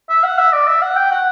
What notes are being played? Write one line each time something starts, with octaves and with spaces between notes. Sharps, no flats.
E5
F#5
E5
D5
E5
F#5
G5
F#5